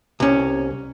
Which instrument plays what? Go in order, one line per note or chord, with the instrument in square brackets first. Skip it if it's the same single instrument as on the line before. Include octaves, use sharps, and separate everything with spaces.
[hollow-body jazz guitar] C2 C#4